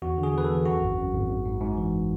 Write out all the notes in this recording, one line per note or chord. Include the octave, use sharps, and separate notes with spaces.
E2 F#4
D3
G#4
E2 B4
A4
E2
F#2 F#4
G#1
F#2
G#1
G#1
G#2
G#2
E3